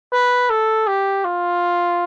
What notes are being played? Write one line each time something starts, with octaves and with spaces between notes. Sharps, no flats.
B4
A4
G4
F4